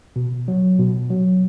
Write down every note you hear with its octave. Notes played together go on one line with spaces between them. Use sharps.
B2
F#3
B2
F#3